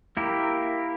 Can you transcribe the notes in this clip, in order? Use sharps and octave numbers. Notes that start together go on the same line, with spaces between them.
A#3 E4 G4 A#4